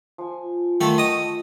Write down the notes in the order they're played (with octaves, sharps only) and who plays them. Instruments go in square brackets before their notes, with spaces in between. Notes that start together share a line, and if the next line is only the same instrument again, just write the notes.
[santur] F3 G#5
[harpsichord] D#3 A3 A4 [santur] F4 F#5
[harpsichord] D#5 D#6 [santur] A5 C#6